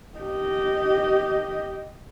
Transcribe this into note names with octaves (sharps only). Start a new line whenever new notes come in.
G4 D#5